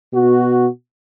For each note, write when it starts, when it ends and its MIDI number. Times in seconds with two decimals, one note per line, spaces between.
0.13 0.67 47
0.13 0.67 66